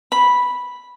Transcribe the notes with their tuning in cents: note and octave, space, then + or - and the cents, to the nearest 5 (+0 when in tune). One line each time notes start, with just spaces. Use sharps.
B5 -5